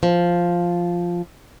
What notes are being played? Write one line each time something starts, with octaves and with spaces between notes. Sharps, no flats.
F3